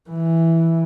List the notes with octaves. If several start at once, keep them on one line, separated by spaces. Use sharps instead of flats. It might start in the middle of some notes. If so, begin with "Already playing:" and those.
E3